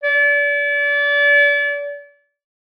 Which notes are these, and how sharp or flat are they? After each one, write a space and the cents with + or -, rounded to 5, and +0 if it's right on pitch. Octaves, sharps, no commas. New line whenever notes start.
D5 -35